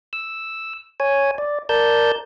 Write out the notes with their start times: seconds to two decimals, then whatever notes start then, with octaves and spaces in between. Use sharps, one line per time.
0.13 E6
1.00 C#5 G#5
1.38 D5
1.69 A#4 D5 A5 G6